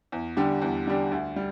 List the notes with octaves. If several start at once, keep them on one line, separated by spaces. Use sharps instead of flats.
E2
D3 G3 D4 G4
E2
D3 G3 D4 G4
D2
G3